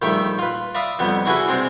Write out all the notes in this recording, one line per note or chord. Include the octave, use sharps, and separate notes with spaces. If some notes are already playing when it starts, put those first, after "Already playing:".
A#1 D#3 G3 A3 E5 G5
F4 B4
D5 E5 F5 B5 D6 D#6
F2 D3 G3 B3
D4 E4 F#4 G#4 A4 B4
C3 G#3 C4 D4